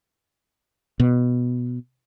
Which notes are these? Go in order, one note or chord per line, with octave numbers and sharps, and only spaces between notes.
B2